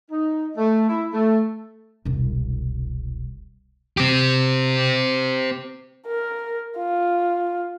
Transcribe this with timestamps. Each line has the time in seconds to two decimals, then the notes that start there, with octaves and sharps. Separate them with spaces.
0.11 D#4
0.56 A3
0.89 E4
1.13 A3
2.05 E1 C2
3.97 C4 G4
6.07 A#4
6.78 F4